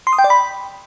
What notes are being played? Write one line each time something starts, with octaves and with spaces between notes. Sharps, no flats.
C6
D#6
G5
D5
B5